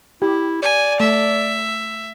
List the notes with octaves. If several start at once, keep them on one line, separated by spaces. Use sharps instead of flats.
E4 G4
D5 G#5
A3 E5